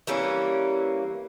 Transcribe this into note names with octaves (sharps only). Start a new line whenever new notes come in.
E3 G3 A#3 C#4